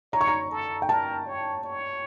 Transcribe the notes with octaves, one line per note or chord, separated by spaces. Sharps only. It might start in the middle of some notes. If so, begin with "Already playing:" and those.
C#5 A#5
C#6
A#5
A4
G5
A#4 A5
C#5
C#5